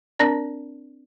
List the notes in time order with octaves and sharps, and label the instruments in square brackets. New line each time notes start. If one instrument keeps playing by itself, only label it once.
[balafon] C4 D4 A#4 D5